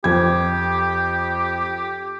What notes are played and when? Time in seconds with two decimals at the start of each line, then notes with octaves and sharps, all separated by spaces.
0.04 F2 G4 G#6